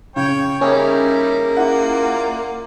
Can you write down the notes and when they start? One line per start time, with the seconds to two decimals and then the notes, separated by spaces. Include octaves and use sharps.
0.16 C#3 C#5 G5 C#6
0.61 G3 A#3 C#4 D#4 E4 G#4
1.57 E4 F4 D5 F#5